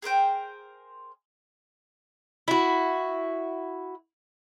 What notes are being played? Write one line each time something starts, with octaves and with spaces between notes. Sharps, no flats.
G#4 A#4 C5 G5
E4 F#4